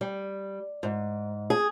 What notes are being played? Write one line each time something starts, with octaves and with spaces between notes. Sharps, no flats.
G3
G#2
G#4